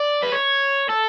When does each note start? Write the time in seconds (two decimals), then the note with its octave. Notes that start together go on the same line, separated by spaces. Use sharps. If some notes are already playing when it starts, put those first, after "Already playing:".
Already playing: D5
0.23 B4
0.32 C#5
0.90 A4